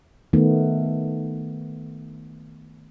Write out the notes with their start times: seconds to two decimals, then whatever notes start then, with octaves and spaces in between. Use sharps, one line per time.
0.33 D#3 A3 B3